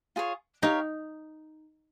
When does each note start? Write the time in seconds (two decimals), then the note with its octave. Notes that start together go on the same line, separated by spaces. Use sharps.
0.16 F4 G#4 C#5
0.62 D#4 G4 A#4 C#5 F5